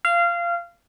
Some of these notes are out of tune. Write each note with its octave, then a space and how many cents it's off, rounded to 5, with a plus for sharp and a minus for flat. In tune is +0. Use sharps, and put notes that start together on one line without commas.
F5 -20